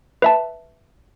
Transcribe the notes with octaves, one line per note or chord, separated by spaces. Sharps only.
B4 E5 A5